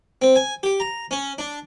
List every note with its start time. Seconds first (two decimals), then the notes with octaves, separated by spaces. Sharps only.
0.22 C4
0.36 G#5
0.63 G4
0.80 A#5
1.11 C#4
1.38 D4